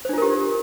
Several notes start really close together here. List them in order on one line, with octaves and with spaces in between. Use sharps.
C5 D4 F4 A#4 G4